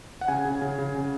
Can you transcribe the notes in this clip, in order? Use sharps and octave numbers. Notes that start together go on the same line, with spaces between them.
F#5
C#3 G#5
C#3
C#3
C#3
C#3